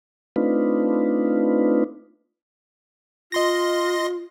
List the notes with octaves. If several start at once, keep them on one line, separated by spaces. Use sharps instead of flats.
A3 C4 D4 D#4 F4 B4
F4 D#5 C6 A#6